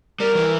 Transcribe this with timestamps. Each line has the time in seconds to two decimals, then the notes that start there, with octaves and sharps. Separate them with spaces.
0.19 G3 A#4
0.35 E3